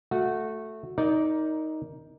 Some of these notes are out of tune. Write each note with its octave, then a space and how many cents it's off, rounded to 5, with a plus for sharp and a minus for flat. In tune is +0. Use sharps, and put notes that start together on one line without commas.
A3 +0 F#4 -15
D#4 +10 A#4 +5 D5 -10